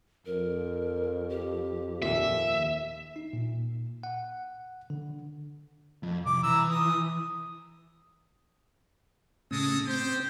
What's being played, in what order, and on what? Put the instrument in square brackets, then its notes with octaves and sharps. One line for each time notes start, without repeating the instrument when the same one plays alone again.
[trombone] F2 [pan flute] A#4
[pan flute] G4
[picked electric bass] D#2 A#2 [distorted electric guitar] E5
[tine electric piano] D#4
A#2
F#5
D3
[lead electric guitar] F2
[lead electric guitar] C2 [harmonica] D6
[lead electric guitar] E3 [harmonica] A#5 E6
[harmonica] D#6
[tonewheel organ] A2 C#3 [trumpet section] G#3 A4 D#6
[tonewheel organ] C4 [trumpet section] G4 C5